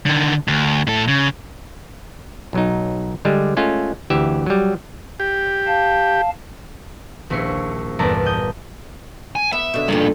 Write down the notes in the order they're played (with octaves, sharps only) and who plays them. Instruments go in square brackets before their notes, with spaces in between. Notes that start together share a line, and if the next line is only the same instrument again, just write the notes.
[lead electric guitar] D3 D#3
D2
A2 A4
C#3
[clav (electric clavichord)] B1 F#3 D#4
D3 G3 G#3
G#3 A3 C#4 F4
D2 E3 G4 E5
F#3 G3
[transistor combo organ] G4
[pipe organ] F5 A5
[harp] D#1 A#1 E4 C#6 C7
G1 E2 A#2 D5 A5 A#5
D#5 G6
[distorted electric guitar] G#5
[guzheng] B3 [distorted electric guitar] E5
[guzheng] B2 D3
[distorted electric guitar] G2 A#2 [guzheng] F4 G4 A4